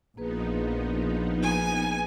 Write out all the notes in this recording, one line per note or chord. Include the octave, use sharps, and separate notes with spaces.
A#1 F3 A#3 B3 D#4 G#4 B4
G#5